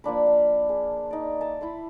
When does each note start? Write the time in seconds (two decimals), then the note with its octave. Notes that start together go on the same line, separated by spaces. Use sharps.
0.04 F3 A#3 D4 B5
0.26 F5
0.69 G#4
1.11 D#4 D5
1.40 E5 A5 A#5
1.61 E4 B5 C6